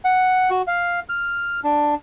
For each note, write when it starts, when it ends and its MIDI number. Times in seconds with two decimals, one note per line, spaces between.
0.05 0.50 78
0.50 0.62 66
0.68 1.00 77
1.09 1.60 89
1.64 1.95 62